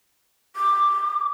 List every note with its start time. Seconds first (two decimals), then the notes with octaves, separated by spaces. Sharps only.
0.56 D6